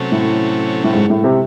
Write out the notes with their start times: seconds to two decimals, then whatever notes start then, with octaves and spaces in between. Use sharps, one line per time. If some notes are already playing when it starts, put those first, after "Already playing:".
Already playing: C3 F#3 A3 C#4
0.12 A2
0.84 A2
0.93 G#2
1.10 A2
1.24 C3